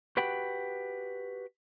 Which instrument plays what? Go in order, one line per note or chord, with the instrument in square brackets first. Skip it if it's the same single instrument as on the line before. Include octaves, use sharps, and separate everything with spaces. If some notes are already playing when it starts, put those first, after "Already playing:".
[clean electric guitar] F#4 G4 B4 F#5 G5 B5